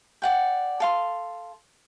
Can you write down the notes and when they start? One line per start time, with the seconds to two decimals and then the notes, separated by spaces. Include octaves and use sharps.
0.22 D5 F#5 G5
0.80 A4 F5 C6